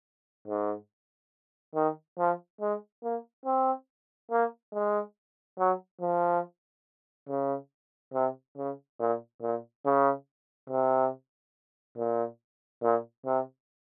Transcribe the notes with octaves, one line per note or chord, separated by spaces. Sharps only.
G#2
D#3
F3
G#3
A#3
C4
A#3
G#3
F#3
F3
C#3
C3
C#3
A#2
A#2
C#3
C3
A#2
A#2
C3